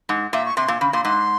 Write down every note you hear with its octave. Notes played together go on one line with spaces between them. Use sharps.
G#2
A#2 E5
C#6
C3 C6
A#2
C#3
A#2 C6
G#2 C6